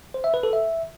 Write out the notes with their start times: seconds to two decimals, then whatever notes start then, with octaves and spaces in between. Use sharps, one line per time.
0.14 C5
0.24 E5
0.34 B4
0.43 A4
0.53 E5